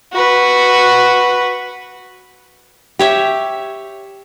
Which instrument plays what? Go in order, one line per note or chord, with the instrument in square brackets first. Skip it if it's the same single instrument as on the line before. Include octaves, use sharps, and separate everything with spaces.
[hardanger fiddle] F#4 B4
[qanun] G4 C#5 E5